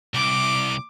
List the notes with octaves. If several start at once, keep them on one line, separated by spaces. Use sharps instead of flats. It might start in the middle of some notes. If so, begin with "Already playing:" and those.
C2 D6